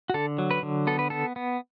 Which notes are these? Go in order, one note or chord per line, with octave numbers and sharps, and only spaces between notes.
F#4
D3 A4
F#3
B4
D3
B3 A4
B4
B3 A4
B3